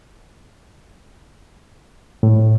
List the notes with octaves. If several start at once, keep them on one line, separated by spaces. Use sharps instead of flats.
A2